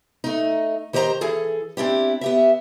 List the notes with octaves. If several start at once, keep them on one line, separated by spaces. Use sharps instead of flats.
A3 D#4
D#3 G4 C5 D#5 A#5
E3 G#4 A4
C4 D4 E4 G4
B3 G4 E5